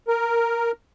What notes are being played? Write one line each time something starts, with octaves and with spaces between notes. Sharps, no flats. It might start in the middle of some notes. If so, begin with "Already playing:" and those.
A#4